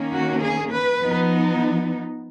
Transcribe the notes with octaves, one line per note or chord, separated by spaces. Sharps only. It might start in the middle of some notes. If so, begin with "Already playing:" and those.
Already playing: D#3 A#3 C#4
F#4
G#4
B4
F3 B3 D#4